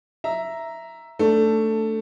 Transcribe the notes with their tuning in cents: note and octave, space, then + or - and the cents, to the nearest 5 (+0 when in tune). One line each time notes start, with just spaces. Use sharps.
E5 +5 A#5 +0
A3 +10 D4 +0